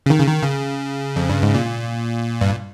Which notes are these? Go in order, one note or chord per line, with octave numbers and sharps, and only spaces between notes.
C#3
D#3
C#3
D#3
C#3
F2
G2
G#2
A#2
G2